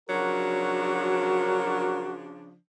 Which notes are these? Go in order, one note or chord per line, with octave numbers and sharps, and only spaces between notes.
C#3 F3 F#3 D4 F#4 A#4